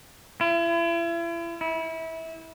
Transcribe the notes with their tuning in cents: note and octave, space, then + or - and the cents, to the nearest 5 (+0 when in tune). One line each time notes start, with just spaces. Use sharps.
E4 +40
E4 -25